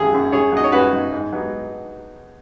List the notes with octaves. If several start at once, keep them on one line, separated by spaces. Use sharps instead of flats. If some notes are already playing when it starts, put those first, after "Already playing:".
Already playing: G#1 F#2 F#3 G#4
F#2 F#3
F#2 G#4 C#5
F#3 D#4 D#5
C#5
F#2 F#4 B4
F#3 D#4
G#2
F#3 B3 D#4